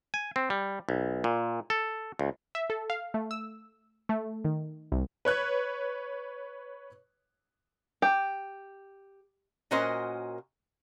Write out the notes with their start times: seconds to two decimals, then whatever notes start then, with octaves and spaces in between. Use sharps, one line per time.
0.14 G#5
0.36 C4
0.50 G3
0.89 B1
1.24 A#2
1.70 A4
2.19 C#2
2.55 E5
2.70 A4
2.90 F5
3.14 A3
3.31 E6
4.09 A3
4.45 D#3
4.92 C2
5.25 B4 C#5 F#6 G#6
8.02 G4
9.71 A#2 C#4 F#4 A#4 C5 D#5